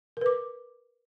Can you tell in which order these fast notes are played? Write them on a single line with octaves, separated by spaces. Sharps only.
A#4 B4 D6